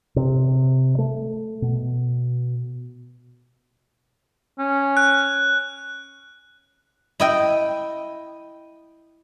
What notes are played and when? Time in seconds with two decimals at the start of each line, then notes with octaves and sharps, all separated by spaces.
0.16 C3
0.98 A3
1.62 B2
4.59 C#4
4.97 F#6
7.20 E4 D#5 G5